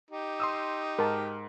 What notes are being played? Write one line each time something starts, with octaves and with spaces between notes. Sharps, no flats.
D#4 G4
C6 D#6 E6
G#2 A#4 A5